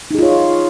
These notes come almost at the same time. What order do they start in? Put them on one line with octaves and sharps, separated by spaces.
D#4 G#4 F4 C#5